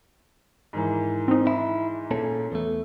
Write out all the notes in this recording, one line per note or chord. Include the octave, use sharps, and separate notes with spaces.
G#2 D#3 E3
C4 D#4
E4
A#2 C#4 A4
E2 A3 B3